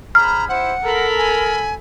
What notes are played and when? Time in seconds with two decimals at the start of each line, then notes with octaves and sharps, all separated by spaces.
0.15 G#4 C5 A#5 B5 F6
0.49 E4 G4 C5 F#5
0.84 A4 A#4 B5
1.18 G#5